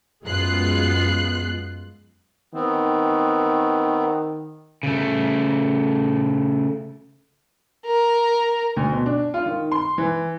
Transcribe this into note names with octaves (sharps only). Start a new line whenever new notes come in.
F#2 G#3 B3 F4 F#6 C7
D#3 B3 C4
C#3 A3
A#4
D2
B2
D4
F4
D#3
C6
E3